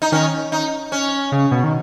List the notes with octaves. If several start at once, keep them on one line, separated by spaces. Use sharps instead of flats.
D#4
D#3 C#4
D#4
C#4
C#3
B2
D#3